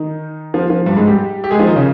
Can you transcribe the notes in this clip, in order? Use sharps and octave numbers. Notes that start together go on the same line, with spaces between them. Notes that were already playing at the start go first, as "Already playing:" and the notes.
Already playing: D#3 D#4
F3
F3
G2 G3
G#2 G#3
G3 G4
G4
G#3 G#4
F3 F4
D#3 D#4
C#3 C#4